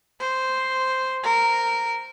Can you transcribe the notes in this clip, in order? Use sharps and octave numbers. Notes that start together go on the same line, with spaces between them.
C5
A#4